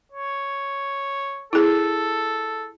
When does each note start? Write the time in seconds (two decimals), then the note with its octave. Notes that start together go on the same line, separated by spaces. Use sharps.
0.12 C#5
1.53 E4 G#4 A4